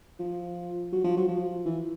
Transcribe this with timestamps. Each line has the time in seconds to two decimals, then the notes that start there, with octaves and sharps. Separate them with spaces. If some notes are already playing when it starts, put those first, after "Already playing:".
0.19 F3
0.92 F#3
1.04 F3
1.17 F#3
1.28 F3
1.65 E3